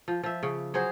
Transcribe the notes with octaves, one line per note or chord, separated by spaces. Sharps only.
F3
F3 E5
C#3
F#3 G#4 C5